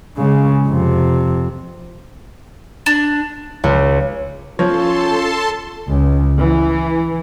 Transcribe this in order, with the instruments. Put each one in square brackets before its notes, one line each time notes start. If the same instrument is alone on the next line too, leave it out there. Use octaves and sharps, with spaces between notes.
[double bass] C#3 G#3
F2 C3
[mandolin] D4
[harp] C#2
[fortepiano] F3 [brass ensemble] C#4 F4 [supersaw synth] A4 A5 C6 [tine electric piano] C#5
[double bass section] C#2
E3